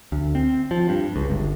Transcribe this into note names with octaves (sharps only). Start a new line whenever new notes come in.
D2
C4
F3
G2
C#2
G1